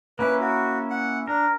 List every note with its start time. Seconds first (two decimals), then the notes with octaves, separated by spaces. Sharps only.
0.19 A#3 C#4 E4 B4
0.40 F#4
0.90 F#5
1.27 D4 A#4